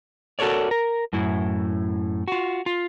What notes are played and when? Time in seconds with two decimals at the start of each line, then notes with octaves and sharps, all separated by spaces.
0.39 F#4 A4 A#4 C#5 D5
0.71 A#4
1.13 F#2 A2 E4
2.28 F4 F#4
2.66 F4